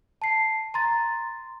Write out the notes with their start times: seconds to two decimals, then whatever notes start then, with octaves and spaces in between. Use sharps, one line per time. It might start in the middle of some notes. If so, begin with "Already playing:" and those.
0.22 A5 C7
0.74 A#5 C6 A6